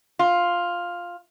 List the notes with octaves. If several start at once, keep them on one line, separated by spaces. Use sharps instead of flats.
F4